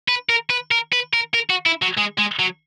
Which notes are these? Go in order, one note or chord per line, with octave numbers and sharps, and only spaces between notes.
B4
A#4
B4
A#4
B4
A#4
A#4
F#4
E4
F#3
G#3
G#3
F#3